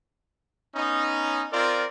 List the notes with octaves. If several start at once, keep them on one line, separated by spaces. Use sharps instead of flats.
B3 C#4 D#4
C4 F4 A#4 D5